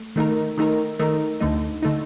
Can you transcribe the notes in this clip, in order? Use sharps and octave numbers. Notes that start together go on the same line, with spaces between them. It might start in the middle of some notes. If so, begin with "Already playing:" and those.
Already playing: A3
D#3 A3 D#4 A#4
D#3 A3 D#4 A#4
D#3 A3 D#4 A#4
D2 D3 A3 D#4
D3 A3 D#4